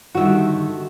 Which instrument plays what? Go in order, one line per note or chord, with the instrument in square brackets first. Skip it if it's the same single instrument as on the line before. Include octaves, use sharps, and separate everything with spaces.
[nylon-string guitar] D3 D#3 G3 [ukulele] F#4 E5